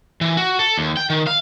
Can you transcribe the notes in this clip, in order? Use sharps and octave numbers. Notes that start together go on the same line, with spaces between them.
E3
F#4
A4
D#2
G5
D#3
F5